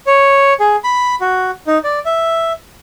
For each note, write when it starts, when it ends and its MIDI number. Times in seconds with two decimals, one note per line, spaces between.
0.07 0.53 73
0.60 0.76 68
0.84 1.15 83
1.21 1.51 66
1.67 1.78 63
1.84 1.99 74
2.05 2.53 76